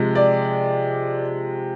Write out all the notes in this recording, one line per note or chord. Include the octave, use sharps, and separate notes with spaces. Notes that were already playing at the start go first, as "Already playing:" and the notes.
Already playing: C3 F3 G#3
D5